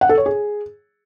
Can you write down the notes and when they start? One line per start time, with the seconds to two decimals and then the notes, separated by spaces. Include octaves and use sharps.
0.01 F#5
0.09 A4
0.18 C#5
0.26 G#4